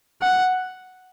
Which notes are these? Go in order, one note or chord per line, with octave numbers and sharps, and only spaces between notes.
F#5